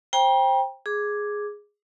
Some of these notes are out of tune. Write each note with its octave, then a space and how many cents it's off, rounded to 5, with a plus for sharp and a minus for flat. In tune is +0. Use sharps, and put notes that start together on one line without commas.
C5 +20 G5 +15 A#5 +45
G#4 +0 D6 +0